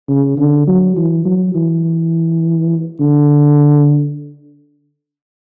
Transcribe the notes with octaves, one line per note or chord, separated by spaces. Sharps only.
C#3
D3
F#3
E3
F#3
E3
D3